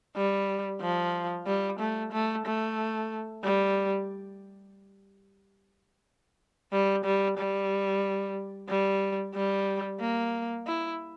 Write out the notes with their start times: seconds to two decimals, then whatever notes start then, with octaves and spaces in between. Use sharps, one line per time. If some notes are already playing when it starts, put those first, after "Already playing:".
0.16 G3
0.81 F3
1.47 G3
1.80 A3
2.12 A3
2.46 A3
3.44 G3
6.72 G3
7.05 G3
7.38 G3
8.69 G3
9.34 G3
10.00 A#3
10.67 E4